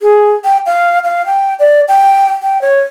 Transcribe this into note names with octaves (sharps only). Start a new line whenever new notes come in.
G#4
G5
F5
F5
G5
D5
G5
G5
C#5